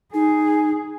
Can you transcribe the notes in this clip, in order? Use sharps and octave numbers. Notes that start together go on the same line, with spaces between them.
D#4 G#4